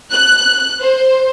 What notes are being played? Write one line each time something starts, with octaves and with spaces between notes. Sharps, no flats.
F#6
C5